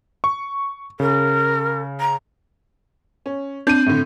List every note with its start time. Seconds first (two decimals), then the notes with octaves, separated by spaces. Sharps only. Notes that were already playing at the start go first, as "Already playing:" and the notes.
0.24 C#6
1.00 C#3 A#4
2.00 A#5
3.26 C#4
3.67 C4 D4 G6 D#7
3.86 A2 D3